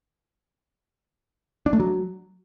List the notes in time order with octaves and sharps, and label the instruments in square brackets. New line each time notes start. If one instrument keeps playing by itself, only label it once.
[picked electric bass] D4
A3
F#3